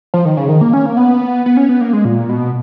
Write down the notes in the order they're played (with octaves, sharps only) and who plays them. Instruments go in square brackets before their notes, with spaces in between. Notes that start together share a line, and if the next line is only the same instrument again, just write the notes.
[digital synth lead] F3
D#3
C#3
D#3
A#3
C#4
A#3
B3
B3
C#4
B3
A#3
G#3
A#2
B2